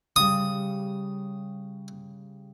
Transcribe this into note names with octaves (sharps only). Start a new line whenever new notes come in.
C#3 G3 D#6